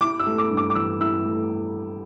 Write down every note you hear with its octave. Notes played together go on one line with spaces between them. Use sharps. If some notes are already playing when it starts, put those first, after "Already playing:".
E4 D6
E6
A3
D6
G2
D6
D6
E3 E6
E4 E6
A3